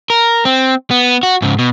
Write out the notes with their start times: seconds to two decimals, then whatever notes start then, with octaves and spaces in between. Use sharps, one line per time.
0.10 A#4
0.45 C4
0.91 B3
1.23 F#4
1.42 G#2 C#3
1.59 B2